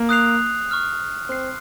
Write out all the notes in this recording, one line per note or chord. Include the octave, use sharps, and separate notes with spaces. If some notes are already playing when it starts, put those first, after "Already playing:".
Already playing: A#3
D#6 F#6 C7 F7
C#6 F6 C7
C4 C6 F#6 C7